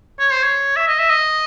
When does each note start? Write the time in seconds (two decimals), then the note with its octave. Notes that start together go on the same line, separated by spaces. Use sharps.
0.20 C#5
0.32 C5
0.43 C#5
0.77 E5
0.88 D#5
0.99 E5
1.10 D#5